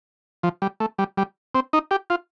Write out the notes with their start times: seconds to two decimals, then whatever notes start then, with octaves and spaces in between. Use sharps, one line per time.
0.43 F3
0.62 G3
0.80 A3
0.99 G3
1.18 G3
1.55 C4
1.73 D#4
1.91 G4
2.10 F4